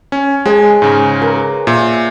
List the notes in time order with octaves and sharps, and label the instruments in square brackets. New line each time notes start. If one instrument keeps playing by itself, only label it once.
[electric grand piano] C#4
[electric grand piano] G#3 [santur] G#4 C#5 A5
[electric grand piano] G#2 C#3
[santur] A#4 B4
[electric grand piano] A#2 [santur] E5